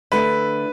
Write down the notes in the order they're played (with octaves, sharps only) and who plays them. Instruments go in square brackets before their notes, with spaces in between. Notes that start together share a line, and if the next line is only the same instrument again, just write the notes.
[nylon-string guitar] D3 A3 E4 [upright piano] B4